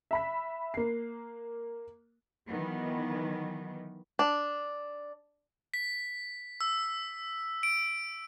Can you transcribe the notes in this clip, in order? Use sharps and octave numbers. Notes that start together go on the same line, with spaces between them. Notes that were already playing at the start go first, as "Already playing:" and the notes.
E5 B5 B6
A#3 C7
D#3 E3 F#3 B3
D4
B6
E6
D7